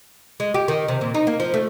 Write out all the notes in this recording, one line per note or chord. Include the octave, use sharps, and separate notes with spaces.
G#3
G4
D#3
C3
A#2
D#4
A#3
F3
A3